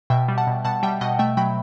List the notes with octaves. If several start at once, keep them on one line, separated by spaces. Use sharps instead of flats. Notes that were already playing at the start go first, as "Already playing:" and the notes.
B2 E5 G5
G3
F#5 A5
B2
B2 F#5 A5
G3 E5 G5
B2 D#5 F#5
A3 E5 G5
F#3 G5 B5